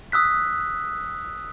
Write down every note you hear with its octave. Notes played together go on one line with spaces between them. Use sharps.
D#6 E6 F#6 B6